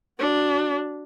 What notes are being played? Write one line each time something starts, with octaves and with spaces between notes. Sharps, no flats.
D4 F#4